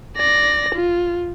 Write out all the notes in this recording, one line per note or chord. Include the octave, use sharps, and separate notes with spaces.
D5 A#6
F4